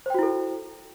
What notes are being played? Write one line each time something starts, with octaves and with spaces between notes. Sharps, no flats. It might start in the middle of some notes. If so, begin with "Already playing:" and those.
E4 F#4 A4 C5 G5